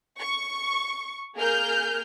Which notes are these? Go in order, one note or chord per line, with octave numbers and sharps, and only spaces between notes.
C#6
A#3 G#4 A#4 F6 G6